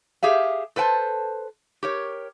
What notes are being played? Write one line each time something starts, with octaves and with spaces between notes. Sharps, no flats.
G4 G#4 E5 F5
A4 B4 C5 G5 A5
G4 A#4 C#5